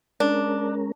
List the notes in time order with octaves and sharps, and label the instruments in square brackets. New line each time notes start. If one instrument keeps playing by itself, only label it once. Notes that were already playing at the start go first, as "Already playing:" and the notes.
[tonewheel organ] G#3 C#4 A#4 [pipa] D4